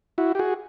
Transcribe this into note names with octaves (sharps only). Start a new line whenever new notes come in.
E4 F#4
G4
F#4 G#4